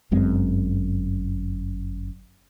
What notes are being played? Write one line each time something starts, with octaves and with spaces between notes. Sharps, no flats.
G1 F#2 G#3 C4